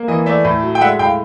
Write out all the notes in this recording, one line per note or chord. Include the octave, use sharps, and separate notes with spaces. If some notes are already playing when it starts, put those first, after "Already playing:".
Already playing: A#3
E3 D#5
A3 D5 E5
A2
F#3
G5
G#3 E5 F#5
A2 F5 G5